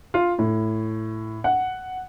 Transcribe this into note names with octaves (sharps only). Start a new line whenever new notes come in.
F4
A2
F#5